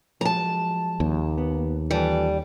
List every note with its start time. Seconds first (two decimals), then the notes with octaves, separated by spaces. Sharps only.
0.21 F3 F#3 G#3 A5 A#5
1.00 D#2 A#3
1.38 B3
1.91 E3 G3 F4 A4